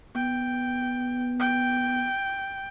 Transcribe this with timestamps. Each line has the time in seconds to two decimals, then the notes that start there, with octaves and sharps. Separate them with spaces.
0.16 B3 G5
1.40 G5